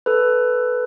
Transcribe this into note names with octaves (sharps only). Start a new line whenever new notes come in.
A4 B4